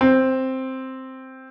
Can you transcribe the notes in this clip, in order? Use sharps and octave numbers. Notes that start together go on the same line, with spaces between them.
C4